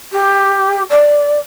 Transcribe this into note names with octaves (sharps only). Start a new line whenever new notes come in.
G4
D5